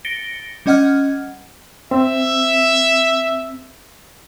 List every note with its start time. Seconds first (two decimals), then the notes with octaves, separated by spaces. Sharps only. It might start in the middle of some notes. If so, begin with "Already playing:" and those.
0.05 A6 A#6 C#7 D7 G7
0.66 G3 C#4 D#5 F#5 F6 G#6
1.91 C4 E5